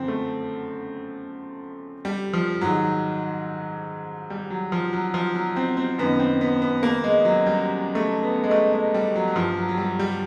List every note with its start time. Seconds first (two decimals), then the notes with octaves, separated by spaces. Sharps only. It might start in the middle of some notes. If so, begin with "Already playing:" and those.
Already playing: F#2 D3 F3 C4
0.08 A3
2.05 G3
2.33 F3
2.61 G#2 D#3 F#3
4.30 G3
4.50 F#3
4.72 F3
4.93 F#3
5.14 F3
5.35 F#3
5.56 C4
5.77 C4
5.98 F#2 D#3 B3
6.19 C4
6.41 B3
6.62 B3
6.83 A#3
7.04 G#3
7.25 F#3
7.46 G3
7.95 A3
8.23 B3
8.44 G#3
8.51 A3
8.73 G#3
8.94 G3
9.16 F#3
9.28 F#3
9.36 G2 E3 F3
9.57 F#3
9.69 F#3
9.78 G3
9.99 G3